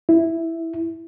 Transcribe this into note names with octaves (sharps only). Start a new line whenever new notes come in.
E4